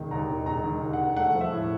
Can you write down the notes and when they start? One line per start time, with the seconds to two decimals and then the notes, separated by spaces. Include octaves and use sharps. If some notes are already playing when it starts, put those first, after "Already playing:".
Already playing: E1 D#3
0.11 D#2 A#5
0.30 E1
0.46 E1 A#5
0.64 D#3
0.81 D#2
0.93 F#5
0.99 E1
1.16 A3 F#5
1.35 F3
1.41 E5
1.52 A2